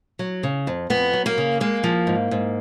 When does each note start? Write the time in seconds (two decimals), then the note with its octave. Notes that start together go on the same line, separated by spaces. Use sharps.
0.19 F#3
0.43 C#3
0.67 F2
0.90 F2 B3
1.13 F#3
1.26 A#3
1.38 C#3
1.61 G#3 A#3
1.84 F3
2.07 G#2
2.31 G#2